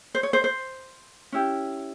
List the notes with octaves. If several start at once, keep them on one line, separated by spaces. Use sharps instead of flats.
C5
C#5
C5
C5
C#4 E4 G4